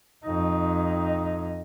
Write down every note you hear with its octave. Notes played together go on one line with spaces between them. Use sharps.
F2 D#4